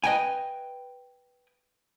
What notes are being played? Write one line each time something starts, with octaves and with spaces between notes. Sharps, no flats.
B4 D#5 G5 G#5